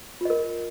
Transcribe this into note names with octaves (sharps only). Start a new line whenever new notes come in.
F4 A#4 D#5